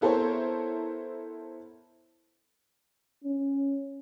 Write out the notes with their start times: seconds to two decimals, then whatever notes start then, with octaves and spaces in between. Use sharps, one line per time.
0.01 B3 E4 A4 A#4 C5 C#5
3.24 C#4